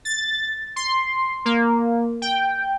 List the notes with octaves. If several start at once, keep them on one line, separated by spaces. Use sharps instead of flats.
A6
C6
A#3
G5